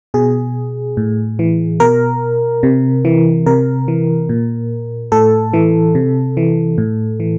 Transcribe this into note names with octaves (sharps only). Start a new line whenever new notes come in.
B2 G#4
A2
E3
B2 A#4
C3
E3
C3 A#4
E3
A#2
A2 A4
E3
C3
E3
A2
E3